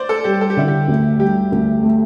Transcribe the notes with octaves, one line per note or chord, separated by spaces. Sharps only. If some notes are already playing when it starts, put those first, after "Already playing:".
Already playing: C5 D5
A4
G3 G4
A4
G4
D3 E4
G4
D2
G3 G4
D2
A3